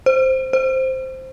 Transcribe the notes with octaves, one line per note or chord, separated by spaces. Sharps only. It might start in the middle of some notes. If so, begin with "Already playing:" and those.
C5
C5